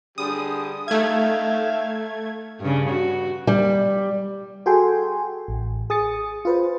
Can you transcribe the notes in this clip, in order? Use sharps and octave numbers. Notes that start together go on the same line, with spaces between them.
D3 G3 G#4 D#6
A3 D#4 E5 F5 G#6
G2 C#3
F#4
G3
F#4 G#4 A4 G5 G#5 C6
A1
G#4 D#6 A6 C#7
F4 B4 C5